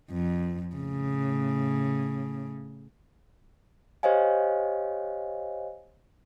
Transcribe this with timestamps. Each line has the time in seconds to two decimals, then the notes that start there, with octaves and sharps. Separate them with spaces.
0.11 F2
0.75 A2 C#3
4.03 G4 C5 C#5 D#5 F5 G#5